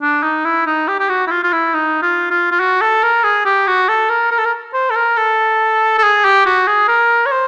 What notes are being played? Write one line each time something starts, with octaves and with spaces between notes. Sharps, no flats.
D4
D#4
E4
D#4
G4
G4
F#4
E4
F4
F4
E4
D#4
F4
F4
F4
F#4
A4
A#4
G#4
G4
F#4
A4
A#4
A#4
A4
A#4
C5
A4
A#4
A4
A4
G#4
G4
F#4
G#4
A#4
C#5
C5